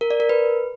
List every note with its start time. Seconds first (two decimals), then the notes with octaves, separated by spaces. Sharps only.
0.01 A#4
0.11 D5
0.20 A#4
0.29 B4